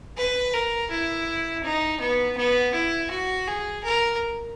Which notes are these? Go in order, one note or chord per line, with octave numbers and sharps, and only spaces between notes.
B4
A#4
E4
D#4
B3
B3
E4
F#4
G#4
A#4